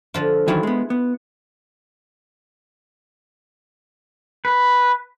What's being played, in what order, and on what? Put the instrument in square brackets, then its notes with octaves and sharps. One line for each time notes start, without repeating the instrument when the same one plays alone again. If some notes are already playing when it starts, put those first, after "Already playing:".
[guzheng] D3 F3 F4
[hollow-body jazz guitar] D#3 E3 F#3 [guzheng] E4 F4 G#5
[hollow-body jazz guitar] G#3 B3
B3
[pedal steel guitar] B4